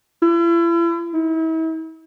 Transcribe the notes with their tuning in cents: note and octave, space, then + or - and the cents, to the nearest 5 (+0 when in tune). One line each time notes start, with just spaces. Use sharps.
E4 +40
E4 -40